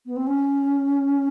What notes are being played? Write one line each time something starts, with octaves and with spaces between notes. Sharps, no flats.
B3
C4
C#4